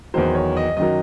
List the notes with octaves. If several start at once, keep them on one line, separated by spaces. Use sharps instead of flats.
E2 D#3 F#3 C5
C#5
D#5
F#2 D#3 F#3 D#5